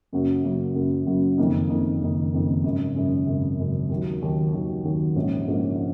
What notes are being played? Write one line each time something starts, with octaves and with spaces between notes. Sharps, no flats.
F#2 C#3 F#3 A#3
F#2 C#3 F#3 A#3
F#2 C#3 F#3 A#3
F#2 C#3 F#3 A#3
F#1 F2 D#3 A#3 D#4
F#1 F2 D#3 A#3 D#4
F#1 F2 D#3 A#3 D#4
F#1 F2 D#3 A#3 D#4
G#1 F#2 C#3
G#1 F#2 C#3
G#1 F#2 C#3
G#1 F#2 C#3
D#2 D#3 F#3
D#2 D#3 F#3
D#2 D#3 F#3
D#2 D#3 F#3
A#1 G#2 F3 A#3 C#4
A#1 G#2 F3 A#3 C#4